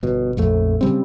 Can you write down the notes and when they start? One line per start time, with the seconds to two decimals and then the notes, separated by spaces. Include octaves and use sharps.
0.03 G1 B2
0.37 A#1 F2 A3
0.81 C#3 G3 C4